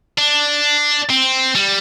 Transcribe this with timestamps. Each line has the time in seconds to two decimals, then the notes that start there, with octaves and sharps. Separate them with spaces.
0.18 D4
1.10 C4
1.55 G3